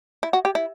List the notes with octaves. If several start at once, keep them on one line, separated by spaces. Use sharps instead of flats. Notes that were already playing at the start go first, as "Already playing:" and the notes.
E4
F#4
G4
E4